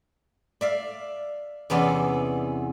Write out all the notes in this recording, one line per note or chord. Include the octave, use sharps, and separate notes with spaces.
D5 E5 F5
E2 C3 E3 B3 C#4 D5